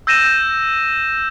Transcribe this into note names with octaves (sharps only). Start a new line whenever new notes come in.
E6 G6 A#6 D#7 E7